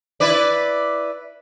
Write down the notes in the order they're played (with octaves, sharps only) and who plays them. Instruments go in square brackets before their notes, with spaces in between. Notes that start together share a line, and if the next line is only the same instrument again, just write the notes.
[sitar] E4 B4 D5